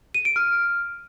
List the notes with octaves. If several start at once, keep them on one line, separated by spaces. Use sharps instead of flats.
D#7
D7
F6